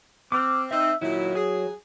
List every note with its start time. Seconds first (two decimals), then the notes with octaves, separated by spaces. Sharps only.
0.32 C4 D6 E6 F6
0.71 C4 D#4 E5 E6
1.02 A#2 D#3 F#3 E4
1.36 G#4